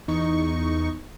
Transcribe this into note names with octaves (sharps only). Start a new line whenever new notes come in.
E2 D#4 C#6